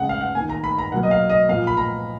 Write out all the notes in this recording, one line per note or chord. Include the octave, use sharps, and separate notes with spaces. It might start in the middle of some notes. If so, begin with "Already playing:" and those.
Already playing: C#3 G#3 F#5
F5
F#5
D#3 A#3 G#5
A#5
B5
A#5
B2 F#3 A#3 F#5
D#5
F5
D#5
A#2 F3 A#3 F5
B5
A#5